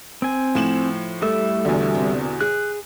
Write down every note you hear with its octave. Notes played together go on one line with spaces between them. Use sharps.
C4 G#5
A2 F3 E7 F#7
G3 A3 A4 E5
E2 B2 D3
C3
G#4 F#6